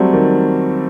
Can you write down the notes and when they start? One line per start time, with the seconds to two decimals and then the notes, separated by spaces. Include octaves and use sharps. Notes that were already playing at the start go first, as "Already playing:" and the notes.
Already playing: F#3 G3 A3 C4
0.13 D#3